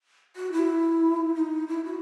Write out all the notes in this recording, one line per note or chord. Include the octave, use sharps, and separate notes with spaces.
F#4
E4
D#4
E4
F#4